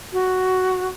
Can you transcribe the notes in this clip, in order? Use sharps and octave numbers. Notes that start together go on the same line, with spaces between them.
F#4